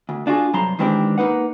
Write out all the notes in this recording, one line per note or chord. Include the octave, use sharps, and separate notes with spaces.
D2
D4 F4 F#4 G#4
G2 C3 F#3 A5 A#5 C6
D#3 E3 G#3 C4 D4 G4
A#3 D#4 B4 F#5